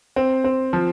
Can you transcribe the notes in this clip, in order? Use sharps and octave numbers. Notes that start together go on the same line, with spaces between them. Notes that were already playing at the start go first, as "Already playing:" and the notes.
C4
C4
F3